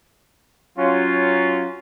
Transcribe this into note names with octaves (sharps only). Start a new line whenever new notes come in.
F#3 C#4 F4